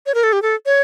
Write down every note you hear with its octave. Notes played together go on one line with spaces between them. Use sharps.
C#5
A#4
A4
G4
A4
C#5